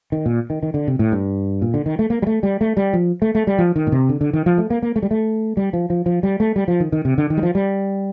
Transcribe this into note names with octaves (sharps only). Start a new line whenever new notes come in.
D#3
A#2
D#3
D#3
D3
C3
A2
G2
A#2
D3
D#3
A3
A#3
G3
A3
G3
A3
G3
F3
A3
A3
G3
F3
D#3
A#2
C3
D3
D3
D#3
F3
A3
A#3
A#3
A3
G3
A3
G3
F3
F3
F3
G3
A3
G3
F3
D#3
D#3
C3
D3
D#3
G3
F3
G3